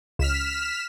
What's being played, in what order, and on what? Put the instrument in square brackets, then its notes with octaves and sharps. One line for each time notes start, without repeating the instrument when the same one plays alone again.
[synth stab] C#2 [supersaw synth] F6 B6 E7